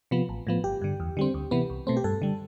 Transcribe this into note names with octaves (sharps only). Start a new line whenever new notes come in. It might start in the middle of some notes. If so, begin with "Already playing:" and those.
C3 F3 B3
A1
A2 F3 B3
G1 G4
G2 D3
E2
D3 G3 C4
D2
C3 E3 B3
C2
B2 A3 C4
G4
G2 A4
D3 G3